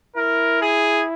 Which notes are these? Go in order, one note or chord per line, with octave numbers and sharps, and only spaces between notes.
E4 A#4
G#4